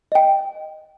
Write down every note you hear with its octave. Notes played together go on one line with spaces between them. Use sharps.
D#5 G5